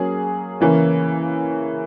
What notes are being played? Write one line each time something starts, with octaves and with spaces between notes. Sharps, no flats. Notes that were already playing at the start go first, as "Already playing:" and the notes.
Already playing: F#3 A#3 C#4 G#4
C#3 E3 A#3 C#4